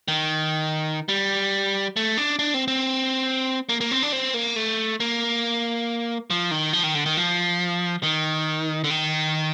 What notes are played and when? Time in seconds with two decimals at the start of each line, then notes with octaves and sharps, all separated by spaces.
0.08 D#3
1.09 G3
1.96 A3
2.18 D4
2.39 D4
2.54 C4
2.68 C4
3.69 A#3
3.81 A#3
3.91 C4
4.02 D4
4.13 C4
4.34 A#3
4.56 A3
5.00 A#3
6.30 F3
6.51 D#3
6.73 F3
6.83 D#3
6.95 D3
7.06 D#3
7.17 F3
8.03 D#3
8.84 D3
8.90 D#3